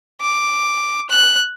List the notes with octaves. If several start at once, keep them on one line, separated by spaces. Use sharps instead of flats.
D6
F#6